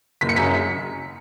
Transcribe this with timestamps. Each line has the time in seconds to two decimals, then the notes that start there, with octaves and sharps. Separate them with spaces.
0.21 F#1 B6
0.29 C#7
0.36 F#2 C#3 B6